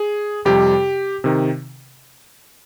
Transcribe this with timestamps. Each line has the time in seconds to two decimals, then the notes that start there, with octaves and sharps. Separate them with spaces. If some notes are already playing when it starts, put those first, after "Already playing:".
Already playing: G#4
0.45 F2 C3 G3 G4
1.24 C3 D#3